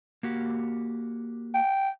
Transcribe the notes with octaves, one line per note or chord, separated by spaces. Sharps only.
A#3 F#4 G4
G5